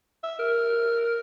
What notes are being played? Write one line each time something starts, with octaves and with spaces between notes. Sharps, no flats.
E5
A#4